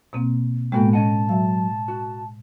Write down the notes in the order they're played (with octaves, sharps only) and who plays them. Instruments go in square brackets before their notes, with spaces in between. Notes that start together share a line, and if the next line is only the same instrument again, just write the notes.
[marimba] B2 A#3 C4
[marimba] A2 G#3 [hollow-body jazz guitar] A#3 B3 F#4 [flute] G5
[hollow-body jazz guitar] C#4 D#5 F#5 [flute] A5
[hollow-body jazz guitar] F#3 [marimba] E5 F5
[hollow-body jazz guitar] F#4